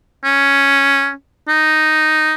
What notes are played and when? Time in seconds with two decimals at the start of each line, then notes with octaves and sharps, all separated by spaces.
0.24 C#4
1.48 D#4